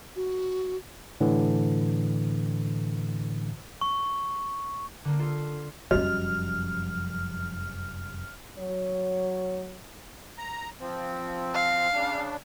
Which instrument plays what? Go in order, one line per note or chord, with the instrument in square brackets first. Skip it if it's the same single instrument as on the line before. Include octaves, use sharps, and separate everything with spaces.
[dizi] F#4
[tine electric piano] A2 D3 E3
[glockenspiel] C#6
[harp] D3 A#3
F4 A4
[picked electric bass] F1 F#2 G3 [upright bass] F3 C#4 [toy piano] F#4 D#5 [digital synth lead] F6
[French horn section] F#3 C#5
[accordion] A#5
F3 C4
[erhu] F5
[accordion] C#3 D4